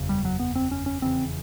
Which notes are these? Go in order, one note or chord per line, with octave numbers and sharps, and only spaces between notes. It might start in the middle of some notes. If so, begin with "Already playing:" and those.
Already playing: F#1 E2 C#3
G3
F#3
B3
C4
C#4
C#4
F1 E2 C#3 C4